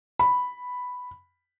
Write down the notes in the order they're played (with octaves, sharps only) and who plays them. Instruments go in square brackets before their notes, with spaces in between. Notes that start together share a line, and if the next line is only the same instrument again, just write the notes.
[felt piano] B5